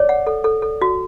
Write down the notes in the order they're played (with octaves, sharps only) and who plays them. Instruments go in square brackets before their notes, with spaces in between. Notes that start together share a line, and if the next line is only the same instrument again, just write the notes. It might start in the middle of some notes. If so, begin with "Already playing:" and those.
Already playing: [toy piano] C#5 [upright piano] D5
[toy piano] F#5
A4
A4
A4
F#4